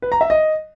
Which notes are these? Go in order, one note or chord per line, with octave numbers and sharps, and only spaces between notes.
B4
A#5
E5
D#5